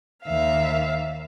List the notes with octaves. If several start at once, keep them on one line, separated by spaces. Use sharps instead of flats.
D#2 E5 F5